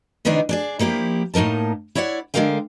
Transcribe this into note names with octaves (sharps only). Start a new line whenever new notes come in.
C3 D#3 E3 B3 D4 D#4
D4 G#4 D5
F3 A#3 E4 G4
A2 A#3 D#4 A#4 A5
E4 C#5 D5 E5 F#5
D3 G#3 G4 A#4 F5 G5